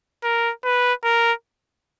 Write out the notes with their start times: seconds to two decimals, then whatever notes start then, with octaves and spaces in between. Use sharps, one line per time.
0.24 A#4
0.65 B4
1.04 A#4